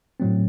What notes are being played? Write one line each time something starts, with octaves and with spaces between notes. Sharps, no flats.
A2 F#3 A3 C4